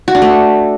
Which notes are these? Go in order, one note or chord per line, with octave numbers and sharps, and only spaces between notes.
F#4
D4
A3